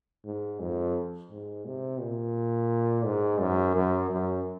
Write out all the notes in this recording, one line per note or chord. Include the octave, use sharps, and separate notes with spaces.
G#2
F2
G#2
C3
A#2
G#2
F#2
F#2
F#2